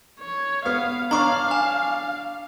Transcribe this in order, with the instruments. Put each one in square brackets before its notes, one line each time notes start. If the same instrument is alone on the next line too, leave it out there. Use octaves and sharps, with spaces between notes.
[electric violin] C#5
[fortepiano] B3 F6 [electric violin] F5
[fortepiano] D4 C#5 D5 [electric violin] F5 [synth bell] A#5 C#6
[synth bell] G#5